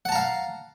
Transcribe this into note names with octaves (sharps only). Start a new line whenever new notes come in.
F5 F#5 A5 A#5